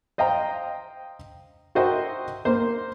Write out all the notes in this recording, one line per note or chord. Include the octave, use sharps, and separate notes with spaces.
C5 D#5 F5 G5 A#5
F#4 A#4 C5 D#5 E5 G5
A#3 C5